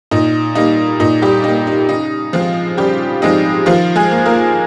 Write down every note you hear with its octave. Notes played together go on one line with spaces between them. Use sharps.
A#2 D#4
G3 A#3 D#4
A#2 D#4
G3 G4
G3 A#3 D#4
D#4
C#3 D#4
F3 G#3 C4 F4
C#3 G3 G4
F3 G#3 C4 D#4
D#3 F3 F4
G#3 G#4
A#3
A#3 A#4